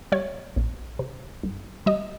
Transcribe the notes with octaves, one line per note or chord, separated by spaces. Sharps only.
G3 C#5
A#1
C3
G1
G3 D#5